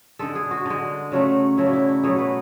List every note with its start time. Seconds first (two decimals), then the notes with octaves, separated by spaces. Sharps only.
0.19 D3 G#3 A4
0.35 G#4
0.51 F#4
0.66 D3 G#3
1.12 C#3 F#3 A3
1.57 C#3 F#3 A3 E4
1.66 D4
1.73 E4
1.89 E4
2.03 B2 F#3 A3 G#4
2.19 B4